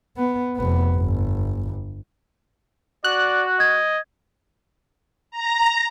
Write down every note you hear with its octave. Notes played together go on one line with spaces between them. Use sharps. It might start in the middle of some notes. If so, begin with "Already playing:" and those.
B3
F1 B3
G1
F#4 D5 F#6
D#5 G#6
A#5